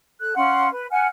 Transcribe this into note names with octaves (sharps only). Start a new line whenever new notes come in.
A4 F#6
C#4 F5 F#5 C6
B4
F#5 G#5 F6